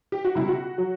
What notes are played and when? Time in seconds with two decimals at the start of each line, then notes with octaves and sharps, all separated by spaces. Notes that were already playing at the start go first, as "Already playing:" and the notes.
0.12 G4
0.25 F#4
0.35 C#2 B2 G3 E4
0.48 F#4
0.78 F#3